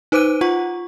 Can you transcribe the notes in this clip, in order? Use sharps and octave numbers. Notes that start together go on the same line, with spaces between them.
D#4 B4 C5 D6 F#6 D#7
F4 F#5 C#6